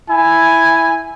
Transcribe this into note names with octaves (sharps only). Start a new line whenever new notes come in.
E4 G#5